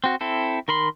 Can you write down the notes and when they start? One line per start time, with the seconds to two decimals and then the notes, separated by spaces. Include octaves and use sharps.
0.04 C4 F#4
0.21 C4 E4 A4
0.68 D#3 A#4 B5 C6